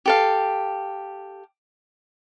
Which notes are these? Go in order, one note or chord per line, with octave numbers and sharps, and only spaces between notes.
G4 A4 F5